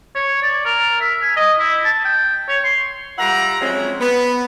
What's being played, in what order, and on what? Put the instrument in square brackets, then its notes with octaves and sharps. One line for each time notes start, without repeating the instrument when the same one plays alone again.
[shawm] C#5
D5
A#4
E5
G#5
D#5
E4
A5
G5
C#5
C6
[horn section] G3 F4 E5 F#5 A#5
F3 F#3 G#3 C4 C#4 E4
B3